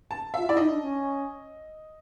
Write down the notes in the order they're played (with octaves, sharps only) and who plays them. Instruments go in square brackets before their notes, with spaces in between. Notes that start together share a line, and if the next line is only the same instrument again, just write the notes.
[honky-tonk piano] A5
[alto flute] F4 [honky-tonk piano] E5
[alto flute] E4 [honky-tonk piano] D5
[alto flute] D#4 [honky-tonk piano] D#5
[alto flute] D4
C#4